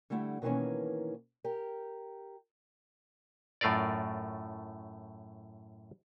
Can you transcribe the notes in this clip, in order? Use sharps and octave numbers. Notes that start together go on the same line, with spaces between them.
D3 G3 A3 E4 F#5
B2 D#3 E3 A#3 C#4
G4 A#4
F#2 A2 A3 F4 A#4 D5